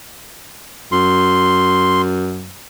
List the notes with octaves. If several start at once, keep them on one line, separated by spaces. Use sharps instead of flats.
F#2 C6